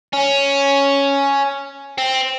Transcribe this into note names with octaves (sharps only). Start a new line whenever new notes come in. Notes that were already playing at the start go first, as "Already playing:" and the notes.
C#4
C4